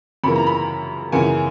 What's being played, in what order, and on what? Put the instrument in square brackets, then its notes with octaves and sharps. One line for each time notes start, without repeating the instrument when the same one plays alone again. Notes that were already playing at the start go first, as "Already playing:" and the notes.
[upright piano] F#2 C#3 E3 A#3 B5
A#5
B5
F#2 C#3 E3 A#3 G#5